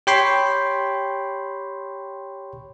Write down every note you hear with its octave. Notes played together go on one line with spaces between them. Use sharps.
G4 C#5 G5 B5 C6